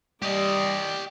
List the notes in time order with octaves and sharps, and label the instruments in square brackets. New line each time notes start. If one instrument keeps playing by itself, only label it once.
[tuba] G3 [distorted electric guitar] G4 D#5 [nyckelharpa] D5